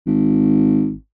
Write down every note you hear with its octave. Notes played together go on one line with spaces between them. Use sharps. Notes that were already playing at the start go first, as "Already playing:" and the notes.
G#1